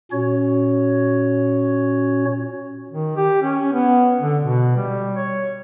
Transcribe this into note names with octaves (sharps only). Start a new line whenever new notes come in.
A#2 C#4 F#4 C#5
D#3
G4
C#4
B3
D3
B2
G3
C#5